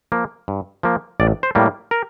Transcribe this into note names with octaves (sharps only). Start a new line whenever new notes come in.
F3 A#3
G2
F3 A#3
A1 D5
C5
A2 G3 A#3
A#4